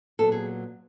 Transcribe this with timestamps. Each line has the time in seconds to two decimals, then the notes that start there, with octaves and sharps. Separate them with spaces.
0.19 A#2 F#3 B3 A4
0.32 G#4